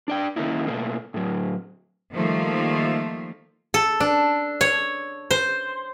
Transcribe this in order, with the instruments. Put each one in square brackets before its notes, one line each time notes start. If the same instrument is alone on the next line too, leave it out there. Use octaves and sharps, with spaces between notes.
[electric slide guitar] D4 D5 G5
D#3 A#3 C#4 D#4 E4
B2 A3 A#3
A2 F#3
[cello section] D#3 F3 G3 A3 A#3
[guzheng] A4
D4
C#5
C5